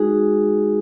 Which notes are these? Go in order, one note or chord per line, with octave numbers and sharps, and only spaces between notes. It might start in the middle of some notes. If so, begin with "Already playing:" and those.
Already playing: G#3 D#4 F#4 G#4